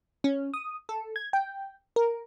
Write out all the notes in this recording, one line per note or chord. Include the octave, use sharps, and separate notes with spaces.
C#4
D#6
A4
G#6
G5
A#4